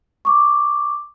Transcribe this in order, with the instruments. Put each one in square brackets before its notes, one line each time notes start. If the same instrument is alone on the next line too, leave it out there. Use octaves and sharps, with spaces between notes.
[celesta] C#6 D6